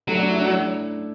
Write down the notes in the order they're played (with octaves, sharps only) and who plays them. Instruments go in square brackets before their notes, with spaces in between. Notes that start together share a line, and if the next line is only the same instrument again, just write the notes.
[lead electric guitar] F#3 [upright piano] A3
[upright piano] D4
E4
D4